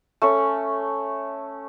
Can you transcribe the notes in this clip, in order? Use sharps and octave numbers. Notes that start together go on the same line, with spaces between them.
A3 C#4 C#6